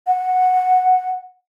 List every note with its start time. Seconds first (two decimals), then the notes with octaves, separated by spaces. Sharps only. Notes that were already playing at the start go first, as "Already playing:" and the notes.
0.07 F#5